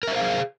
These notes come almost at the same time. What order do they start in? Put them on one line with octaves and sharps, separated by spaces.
A#4 E5 C5 F5 G#4